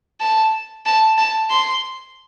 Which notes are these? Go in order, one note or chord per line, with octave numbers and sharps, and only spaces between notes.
A5
A5
A5
C6